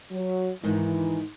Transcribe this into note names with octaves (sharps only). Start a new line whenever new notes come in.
F#3
G#2 D#3 E3